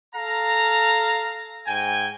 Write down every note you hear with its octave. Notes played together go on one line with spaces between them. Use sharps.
A4 F5 A#5
G#2 G5 G#5